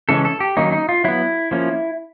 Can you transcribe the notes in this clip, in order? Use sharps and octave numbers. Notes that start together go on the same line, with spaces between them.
C#3 E3 G#3 C#4 A4
A4
G4
D#3 F#3 A#3 C#4 D#4
D#4
F4
F#3 B3 E4
F3 A#3 C#4